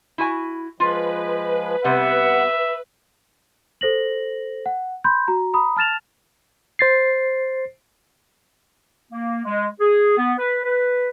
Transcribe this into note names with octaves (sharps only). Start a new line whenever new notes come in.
E4 F#4 G#5
F3 G#3 F4 B4
C3 G3 B3 E5 F#5
A4 C5 A#6 F#7
F#5
B5 C6 G6
F#4 A#5
A#5 B5 D#6
A5 F6 A6 E7 F7
C5 A6 C7
A#3
G#3
G#4
B3
B4
B4